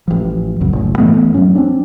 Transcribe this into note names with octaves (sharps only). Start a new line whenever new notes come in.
A1 F3
B1 F#2 C#3 F#3
F#1 A2
G2 E3 A3 B3
F#3 C#4
C4 D4